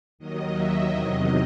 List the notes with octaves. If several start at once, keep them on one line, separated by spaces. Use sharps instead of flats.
D#2 D#3 F#3 D#5
E5
E2 C3 D#3 F#3 D#5